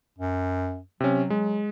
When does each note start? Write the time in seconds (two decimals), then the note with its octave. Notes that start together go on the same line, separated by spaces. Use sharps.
0.19 F#2
1.00 C3 F#3 C#4
1.30 G#3